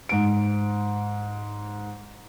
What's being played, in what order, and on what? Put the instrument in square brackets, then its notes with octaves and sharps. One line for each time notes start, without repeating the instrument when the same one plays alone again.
[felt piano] G#2 D7